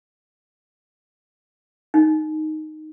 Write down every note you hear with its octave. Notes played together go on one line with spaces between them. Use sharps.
D#4